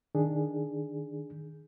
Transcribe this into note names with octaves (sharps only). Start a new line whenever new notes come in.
D#3 D4 G#4